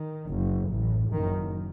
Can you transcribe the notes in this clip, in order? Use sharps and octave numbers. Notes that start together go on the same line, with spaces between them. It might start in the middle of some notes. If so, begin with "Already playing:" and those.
Already playing: D#3
F#1 F#2
A1 A2
F#1 F#2 D#3